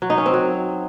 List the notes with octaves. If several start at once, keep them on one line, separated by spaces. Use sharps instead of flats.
F#3
D#4
C#4
C4
F#3